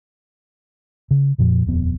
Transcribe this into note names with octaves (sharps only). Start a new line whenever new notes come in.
C#3
F2 A#2 F3
D#1 F2 B3